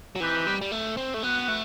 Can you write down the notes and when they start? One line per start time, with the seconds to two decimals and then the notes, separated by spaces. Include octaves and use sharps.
0.15 F#3
0.20 E3 C4 D#4 G4 B4
0.47 G3
0.61 G3
0.72 A3
0.97 C4
1.14 A3
1.23 B3 F#4 B4 F#5
1.48 A3